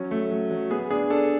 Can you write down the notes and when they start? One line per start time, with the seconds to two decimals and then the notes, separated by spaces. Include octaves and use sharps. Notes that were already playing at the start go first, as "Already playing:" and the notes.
Already playing: F#3 C#4
0.11 A3
0.31 F#3
0.51 F#3
0.71 B3 G#4
0.90 D4 G#4
1.10 D4 A4